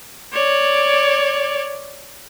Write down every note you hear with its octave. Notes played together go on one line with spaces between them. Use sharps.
C#5 D5